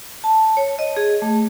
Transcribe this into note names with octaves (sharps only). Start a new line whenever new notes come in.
A5
C#5
D#5
G#4
A3